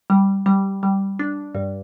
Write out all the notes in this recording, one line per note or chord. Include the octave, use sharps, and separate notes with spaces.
G3
G3
G3
D4
G2